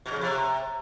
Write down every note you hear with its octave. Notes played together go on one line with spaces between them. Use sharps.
B2
C#3
F2
C3